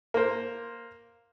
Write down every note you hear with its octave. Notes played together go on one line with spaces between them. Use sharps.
A#3 C5